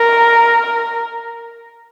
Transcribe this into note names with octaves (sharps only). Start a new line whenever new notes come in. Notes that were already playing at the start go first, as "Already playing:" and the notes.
Already playing: A#4